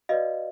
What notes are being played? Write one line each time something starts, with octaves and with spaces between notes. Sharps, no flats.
F#4 B4 D5 D#5 F5